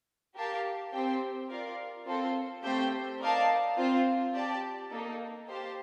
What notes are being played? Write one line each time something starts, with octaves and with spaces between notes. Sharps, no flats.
G4 A#4 F5 A5
C4 G4 C5 G5
F4 A#4 D5 F5
C4 F4 A4 C5
A3 C4 G4 C5 G5
D#4 A#4 D5 F5 A5
C4 F4 C5
G4 D5 A5
A#3 D#4 A4
G4 C5 F5 A5